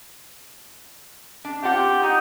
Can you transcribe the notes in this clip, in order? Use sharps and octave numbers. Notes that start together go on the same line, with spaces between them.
D4
C4 F4 G4 F#5
D#4 F#5